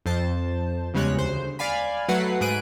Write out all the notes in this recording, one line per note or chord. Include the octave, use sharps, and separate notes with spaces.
F2 C5 A5
E2 C#3 G3 G#3 C#5 F#6
D2 C5
D5 F5 G#5 B5
F#3 A3 B4 F#5 B5 C7
G#2 G#4 B5 F#6 D7 D#7